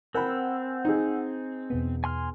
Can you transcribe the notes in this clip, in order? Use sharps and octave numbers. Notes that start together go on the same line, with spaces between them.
C4 A#4 F#5 G#5 B5 E6
D#4 G#4
E2 B2 B3
G#5 C6 F6